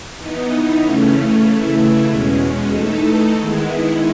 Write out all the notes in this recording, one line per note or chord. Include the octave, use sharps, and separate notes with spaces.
E3 B3 D#4
C#3 E3 A3 C#4
C#3 E3 A3 E4
E2 B2 G#3 C#4
E3 A3 D#4 A4
D#3 G#3 B3 E4